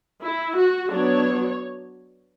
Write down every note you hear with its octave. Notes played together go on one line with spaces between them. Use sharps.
E4
F#4
F#3 B3 D4 C#5